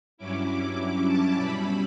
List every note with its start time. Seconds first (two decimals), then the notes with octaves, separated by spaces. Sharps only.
0.18 G2 F#3 C#4 E4 D6
0.48 D6
1.07 A5
1.37 B2 G3 C#4 E4 B5